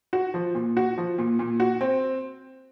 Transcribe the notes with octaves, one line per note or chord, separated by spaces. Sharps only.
F#4
F3
A#2
F#4
F3
A#2
A#2
F#4
C4